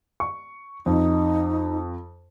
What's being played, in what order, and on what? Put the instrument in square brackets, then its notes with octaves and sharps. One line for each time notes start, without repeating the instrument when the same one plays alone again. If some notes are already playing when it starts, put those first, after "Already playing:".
[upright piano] C#6
[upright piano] F2 [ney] D#4